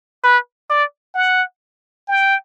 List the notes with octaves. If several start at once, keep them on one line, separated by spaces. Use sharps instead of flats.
B4
D5
F#5
G5